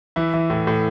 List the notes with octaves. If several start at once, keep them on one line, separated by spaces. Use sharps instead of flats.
E3 E4
E3
A2
A2